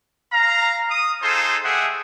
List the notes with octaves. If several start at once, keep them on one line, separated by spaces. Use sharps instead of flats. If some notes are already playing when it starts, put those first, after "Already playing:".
F5 A#5
D#6
D#4 F4 G#4 A4 C5
G#3 A3 G4 G#4 E5 F#5